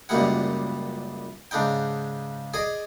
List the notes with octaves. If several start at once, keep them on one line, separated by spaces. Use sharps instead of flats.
C#2 F#2 A#2 G3 D#4 F#5
G#2 C#3 D4 D#4 G5
G#4 D5 D#5